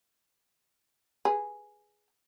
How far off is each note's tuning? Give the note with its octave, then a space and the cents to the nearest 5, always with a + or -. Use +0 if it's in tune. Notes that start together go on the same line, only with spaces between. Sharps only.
G#4 +0 B4 +0